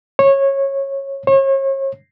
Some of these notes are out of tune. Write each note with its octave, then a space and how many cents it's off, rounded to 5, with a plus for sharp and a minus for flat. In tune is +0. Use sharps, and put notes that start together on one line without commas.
C#5 -15
C#5 -35